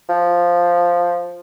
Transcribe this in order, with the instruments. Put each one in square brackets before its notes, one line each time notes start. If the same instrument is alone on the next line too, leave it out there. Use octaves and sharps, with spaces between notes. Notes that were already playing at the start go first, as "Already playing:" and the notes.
[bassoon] F3